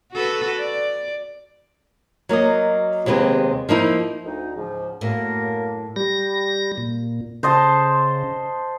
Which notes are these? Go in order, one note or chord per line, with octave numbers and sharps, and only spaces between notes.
F#4 A4 B4
D5
F#3 A#3 F#4 D#5
D#2 C3 G#3 B3 B4 D#5
F3 A#3 D#4 E4
D2 D#4
C#2 G#2 F3
F#2 A2 A#3 A#4
G3 A#6
A#2
C#3 C5 D#5 A5